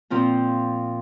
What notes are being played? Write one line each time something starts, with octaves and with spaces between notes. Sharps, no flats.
A#2 F3 C4 F4